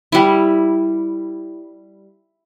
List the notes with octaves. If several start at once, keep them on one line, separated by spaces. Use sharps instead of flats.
G3 E4